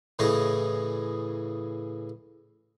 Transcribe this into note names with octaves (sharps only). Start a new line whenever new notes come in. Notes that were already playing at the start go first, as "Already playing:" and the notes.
A2 C#3 E3 G#4 D#5 C#6